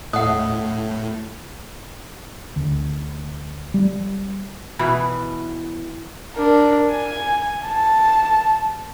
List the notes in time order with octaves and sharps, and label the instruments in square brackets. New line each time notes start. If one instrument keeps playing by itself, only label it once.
[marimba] D#2 D#5 [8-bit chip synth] A2 [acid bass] A3 [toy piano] F#5 D#6
[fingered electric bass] D2
G3
[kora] B2 E3 B4
[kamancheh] D4 A#4
G#5
A5